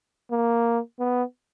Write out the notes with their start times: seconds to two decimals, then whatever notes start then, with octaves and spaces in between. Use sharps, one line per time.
0.31 A#3
0.99 B3